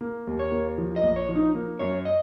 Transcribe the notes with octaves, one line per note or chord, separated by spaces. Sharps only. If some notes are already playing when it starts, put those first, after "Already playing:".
A#3
D#2
C#5
A#3
F3
D#5
A#1
C#5
F3
D#4
A#3
F#2 C#5
D#5